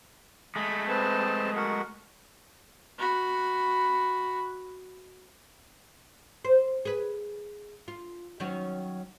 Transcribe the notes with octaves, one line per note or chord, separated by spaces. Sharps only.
G#3 A3 B5
C4 B4 A5
F#4 A#4 F#5
F#4 B5
C5
G#4 B4
F4
D#3 F#3 C#4